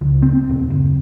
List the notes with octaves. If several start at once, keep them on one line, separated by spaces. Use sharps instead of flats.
C#2
C4
D#1
F#1